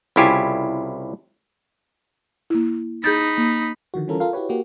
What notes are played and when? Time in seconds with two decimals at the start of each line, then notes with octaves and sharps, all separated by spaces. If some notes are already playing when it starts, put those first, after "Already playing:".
0.16 C2 C#3 E4 F4 G4 G#5
2.50 A#3 E4
3.04 D#4 G#4 B5 G6 A6
3.38 A#3
3.94 D3 D#3 F3 F#4
4.08 E3 G3 C#4 F4 A4 A#4
4.20 F4 A4 A#4 F5
4.33 E4 F#4 G4 B4 C#5
4.49 A#3 F#4 G4